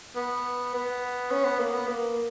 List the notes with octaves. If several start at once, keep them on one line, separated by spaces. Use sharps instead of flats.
B3
B3
C#4
B3
A#3
B3
A#3